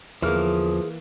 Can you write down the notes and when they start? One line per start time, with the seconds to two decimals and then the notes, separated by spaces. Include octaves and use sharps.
0.22 E2 D3 E3 F3 A#3 G#4 F6